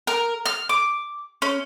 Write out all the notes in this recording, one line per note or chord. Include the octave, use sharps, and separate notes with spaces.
A#4
F6
D6
C#4